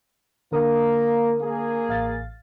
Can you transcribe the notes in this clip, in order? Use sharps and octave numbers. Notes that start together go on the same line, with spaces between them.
D3 A#3 A#4 D#6
A#3 G#4
A1 F5 A6